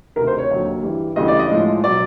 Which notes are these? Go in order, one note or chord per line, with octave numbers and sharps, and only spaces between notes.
D2 C3 D#3 A#4
C5
C#5
D#2 D3 F#3
G2 E3 G3
D2 C#3 E3 G3 D#5
D5
D#5
A2 F3 G#3
B2 F#3 D5